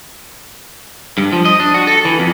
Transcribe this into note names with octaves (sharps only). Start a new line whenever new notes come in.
G2
F3
D#5
D4
F#4
A4
E3
F2